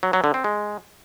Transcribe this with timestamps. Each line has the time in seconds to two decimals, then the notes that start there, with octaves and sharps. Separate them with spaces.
0.03 F#3
0.13 F#3
0.24 D3
0.34 C4
0.44 G#3